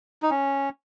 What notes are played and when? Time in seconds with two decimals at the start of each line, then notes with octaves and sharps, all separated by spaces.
0.23 D#4
0.30 C#4